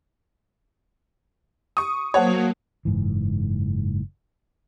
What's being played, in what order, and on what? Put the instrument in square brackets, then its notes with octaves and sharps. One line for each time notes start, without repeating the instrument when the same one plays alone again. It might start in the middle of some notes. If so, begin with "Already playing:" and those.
[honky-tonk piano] C#6 D#6
[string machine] F#3 A#3 [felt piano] C5 F#5 A5 [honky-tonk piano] C#5
[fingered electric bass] F#1 G#2 E3